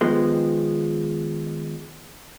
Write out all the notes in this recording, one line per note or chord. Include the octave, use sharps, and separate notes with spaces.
D#3 F3 G#3 B3